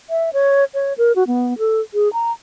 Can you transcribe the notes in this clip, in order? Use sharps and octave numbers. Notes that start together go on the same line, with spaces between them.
E5
C#5
C#5
A#4
F#4
B3
A4
G#4
A#5